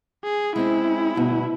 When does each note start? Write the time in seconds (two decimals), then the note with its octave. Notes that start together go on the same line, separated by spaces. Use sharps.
0.24 G#4
0.56 G#3 C4 C#4 E4
1.15 D2 G2 B2